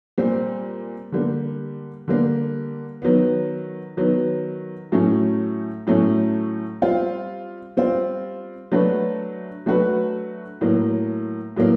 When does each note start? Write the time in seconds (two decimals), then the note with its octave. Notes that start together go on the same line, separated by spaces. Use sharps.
0.18 A#2 G3 C4
1.12 D3 G3 A#3
2.08 D3 G3 A#3
3.02 D#3 F#3 B3
3.97 D#3 F#3 B3
4.92 A2 F#3 A3 C#4
5.87 A2 F#3 A3 C#4
6.82 G3 C4 F4
7.77 G3 C4 F4
8.72 F#3 A3 D4 F#4 B4
9.66 F#3 A3 D4 F#4 B4
10.61 A2 F#3 A#3
11.56 A2 F#3 A#3